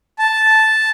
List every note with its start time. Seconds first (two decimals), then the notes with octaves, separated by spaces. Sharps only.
0.19 A5